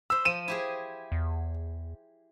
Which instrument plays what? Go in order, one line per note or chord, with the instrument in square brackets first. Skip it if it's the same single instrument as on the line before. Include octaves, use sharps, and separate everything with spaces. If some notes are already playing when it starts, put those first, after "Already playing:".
[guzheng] C5 B5 [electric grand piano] E6
[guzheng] F3 [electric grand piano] D#7 E7
[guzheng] E4 G4 G#4
[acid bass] E2